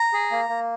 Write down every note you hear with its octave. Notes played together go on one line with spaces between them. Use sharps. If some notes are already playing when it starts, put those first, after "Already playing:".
Already playing: A#5
G#4
A#3
A#3